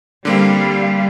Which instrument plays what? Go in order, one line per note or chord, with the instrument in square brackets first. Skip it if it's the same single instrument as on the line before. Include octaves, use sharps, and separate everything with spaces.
[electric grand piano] D3 A#3 C4 [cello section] G3 F5